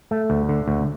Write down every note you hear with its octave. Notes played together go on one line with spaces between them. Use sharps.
A3
D2
D3
D2